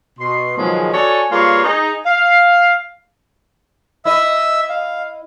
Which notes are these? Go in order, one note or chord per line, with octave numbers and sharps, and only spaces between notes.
B2 C6
B2 D#3 F3 F#3 G#3
F#4 A4 C#5 D5 G#5
G3 A#3 F4 G#4 B4 C#5
D#4 G#4
F5
E4 D#5 E5 E6
F5